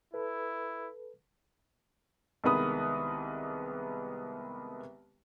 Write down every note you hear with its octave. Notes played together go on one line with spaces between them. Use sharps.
E4 A4 B4
C2 D#3 G#3 B3 B4 D#6